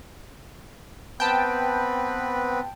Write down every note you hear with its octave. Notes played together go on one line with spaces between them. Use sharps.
B3 C4 B4 G5 A5